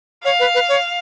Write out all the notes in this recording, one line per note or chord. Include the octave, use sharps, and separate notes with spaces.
C#5 F5
B4
B4
C#5